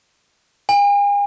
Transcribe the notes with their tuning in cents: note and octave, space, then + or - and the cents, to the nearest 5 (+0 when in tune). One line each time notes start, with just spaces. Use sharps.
G#5 -45